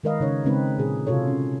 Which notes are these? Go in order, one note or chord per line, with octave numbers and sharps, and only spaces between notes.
D#3 G#3 A#4 B4 D#5 F5
C#3 D#4 C#5
C#3 G#3 C4 D#4 B4
A#2 D3 F3 G#4
C3 F4 F#4 A4 C#5
C#4